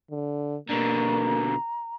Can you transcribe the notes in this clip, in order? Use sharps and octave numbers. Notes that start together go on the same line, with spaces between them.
D3
B2 D3 A#3 A#5